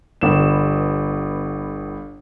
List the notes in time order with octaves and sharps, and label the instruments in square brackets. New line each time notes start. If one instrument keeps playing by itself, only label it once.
[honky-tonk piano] G1 B3 E7